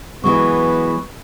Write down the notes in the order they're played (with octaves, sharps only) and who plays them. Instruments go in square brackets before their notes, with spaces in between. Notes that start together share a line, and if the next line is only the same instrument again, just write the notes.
[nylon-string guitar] E3 F#3 G#3 [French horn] B3 [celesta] C#6